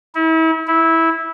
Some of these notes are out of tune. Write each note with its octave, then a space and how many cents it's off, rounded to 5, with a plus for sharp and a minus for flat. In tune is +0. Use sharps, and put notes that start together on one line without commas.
E4 -35
E4 -10